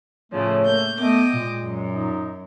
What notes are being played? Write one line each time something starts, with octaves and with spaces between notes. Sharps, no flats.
A2 C#3 F3 A3 C#5
A#3 G6
A3 B3 D#5 G5 D6
A#2 G#3
F#2
D#4